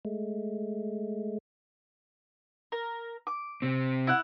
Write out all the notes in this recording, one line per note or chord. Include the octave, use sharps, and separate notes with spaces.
G#3 A3
A#4
D6
C3 C4
E4 F#5